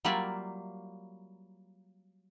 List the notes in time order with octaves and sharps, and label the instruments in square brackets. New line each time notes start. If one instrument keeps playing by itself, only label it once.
[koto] F#3 G3 A#3 F4 D5 E5